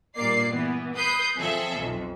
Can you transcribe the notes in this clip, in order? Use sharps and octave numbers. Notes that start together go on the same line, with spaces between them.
G2 A#2 A#3 D5 C7
E3 B3
B4 B5 D#6 G6 C7
F3 C4 G#4 A4 E5
B1 F2